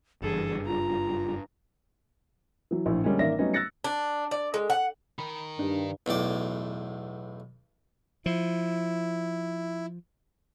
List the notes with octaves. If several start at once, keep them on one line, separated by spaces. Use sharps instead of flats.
F#1 G2 E3 G#4 A4
F4 A#5
E3 F#3
A#1 A2
D3 G3 G#3 A#3 C#4
A1 D#3 A#3 D5 E5 A#6
F#3 G3 A3 B3 C#4 D#4
E6 F#6 A6 A#6 C#7
D4
D5
G#3
F#5
D#3 A#4 B5
G2 D4 D#4
B1 E2 A2 D5
F3 E4